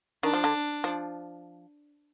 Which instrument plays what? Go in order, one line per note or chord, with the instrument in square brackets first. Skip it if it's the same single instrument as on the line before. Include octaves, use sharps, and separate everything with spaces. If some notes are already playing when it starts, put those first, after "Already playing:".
[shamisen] D#3 [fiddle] D4
[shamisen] F3
D3
F3